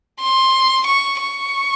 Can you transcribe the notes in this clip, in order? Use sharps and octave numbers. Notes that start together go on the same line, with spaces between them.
C6
C#6
C#6